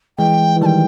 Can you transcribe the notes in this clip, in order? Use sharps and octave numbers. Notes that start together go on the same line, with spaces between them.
E3 G#3 G5
E3
D#3 G3 G5 A5